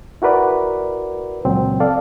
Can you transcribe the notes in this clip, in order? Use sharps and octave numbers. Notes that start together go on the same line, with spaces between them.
E4 F#4 A#4 B4 D5
C#2 A#2 F#3 C4
A4 D5 F5